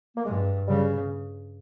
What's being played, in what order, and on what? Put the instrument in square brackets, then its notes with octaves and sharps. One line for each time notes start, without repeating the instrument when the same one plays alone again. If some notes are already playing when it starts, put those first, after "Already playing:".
[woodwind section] A#3
[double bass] G2 [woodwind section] G#3
[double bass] C#3 [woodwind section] G3